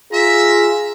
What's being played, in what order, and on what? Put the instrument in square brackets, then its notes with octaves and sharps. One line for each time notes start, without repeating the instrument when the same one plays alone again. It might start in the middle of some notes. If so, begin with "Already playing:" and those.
[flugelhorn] F4 [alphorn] G#4 [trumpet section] E5 A#5